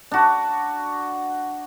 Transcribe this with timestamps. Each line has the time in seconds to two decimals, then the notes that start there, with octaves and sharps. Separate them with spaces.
0.11 D4 F#4